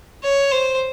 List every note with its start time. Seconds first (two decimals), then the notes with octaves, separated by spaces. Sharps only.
0.23 C#5
0.51 C5